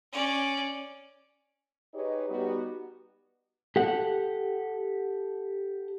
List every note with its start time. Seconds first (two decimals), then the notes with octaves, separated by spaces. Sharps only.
0.13 C#4 D5
1.94 D#4 G4 G#4 B4 C#5 D#5
2.29 G3 B3 D#4 F#4 G4
3.76 G4 A4 F#5